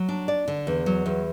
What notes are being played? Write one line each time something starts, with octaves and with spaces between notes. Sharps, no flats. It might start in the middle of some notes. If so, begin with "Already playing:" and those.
Already playing: F#3
D4
D5
D3
E2
F#3
E2